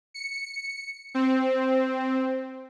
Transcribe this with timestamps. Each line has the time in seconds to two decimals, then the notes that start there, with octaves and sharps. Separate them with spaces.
0.14 C#7
1.14 C4